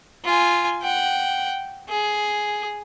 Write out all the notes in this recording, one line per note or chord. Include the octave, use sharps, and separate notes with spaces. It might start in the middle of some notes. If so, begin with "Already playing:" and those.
F4 G#5
F#5 G5
G#4